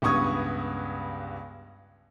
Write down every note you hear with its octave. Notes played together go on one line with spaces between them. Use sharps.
C#2 G2 B3 C#6 D#6 G#6